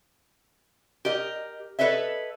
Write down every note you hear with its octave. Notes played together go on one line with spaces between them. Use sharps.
G4 A#4 D#5
A4 B4 C#5 D#5 E5